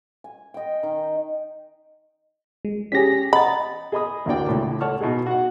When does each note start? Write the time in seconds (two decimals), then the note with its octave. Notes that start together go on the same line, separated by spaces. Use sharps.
0.24 G#5
0.54 D#5 G5
0.83 D#3
2.65 G#3
2.92 C#4 G4 G#4 A#6 B6
3.33 D#5 F#5 A#5 B5 A6
3.92 G#4 D#5 B5 D#6
4.26 A1 D2 A#3 D4 D5 G5
4.47 C#2 A2 D6
4.81 A4 C#5 F#5 A5 C#6 F6
5.01 B2 D#4 G#4
5.26 F#4 F#5